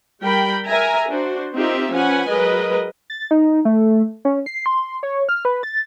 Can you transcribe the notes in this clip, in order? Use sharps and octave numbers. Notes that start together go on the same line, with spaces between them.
G3 A#4 G5 B5
A#4 E5 G#5 A#5
D4 F#4 C5
C4 D#4 F4 G4 A#4 E5
F3 C#4 B4 F#5 G#5
F#3 G#3 A#4 B4 D#5
A6
D#4
A3
C#4
C7
C6
C#5
F6
B4
A6